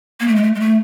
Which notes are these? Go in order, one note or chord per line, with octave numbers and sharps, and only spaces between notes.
A#3
A3
G#3
A3
G#3
A3